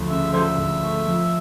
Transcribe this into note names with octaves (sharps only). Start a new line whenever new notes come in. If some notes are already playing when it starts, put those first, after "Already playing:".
Already playing: D2 F3 A3
C#3 E5
F3 A4 C5 E5
D2
A3
F3